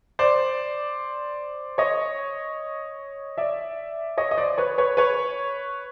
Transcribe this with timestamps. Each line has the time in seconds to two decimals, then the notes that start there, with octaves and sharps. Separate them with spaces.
0.19 C5 D5
1.78 C#5 D#5
3.38 D5 E5
4.18 C#5 D#5
4.31 D#5
4.37 C5 D5
4.58 B4 C#5
4.78 B4 C#5
4.97 B4 C#5